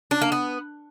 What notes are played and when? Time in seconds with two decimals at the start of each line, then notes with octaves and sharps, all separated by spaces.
0.11 D4
0.21 A#3
0.32 B3